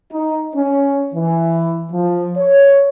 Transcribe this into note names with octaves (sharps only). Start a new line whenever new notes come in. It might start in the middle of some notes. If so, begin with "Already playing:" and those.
D#4
C#4
E3
F3
C#5